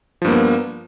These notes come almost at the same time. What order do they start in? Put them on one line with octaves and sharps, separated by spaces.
F3 G2 A#3 B3